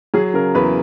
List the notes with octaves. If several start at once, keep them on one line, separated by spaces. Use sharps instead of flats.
F#3 G#4
C#3 A#4
E2 B4